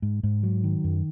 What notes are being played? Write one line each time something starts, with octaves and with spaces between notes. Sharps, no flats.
G#2
G#2
F#3
D#3
F#2